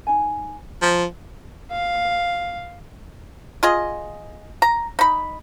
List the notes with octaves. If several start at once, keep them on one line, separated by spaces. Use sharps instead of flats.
D#4 G#5
F3 A#5
F5
F4 G#4 D#5
A#5
D#4 B5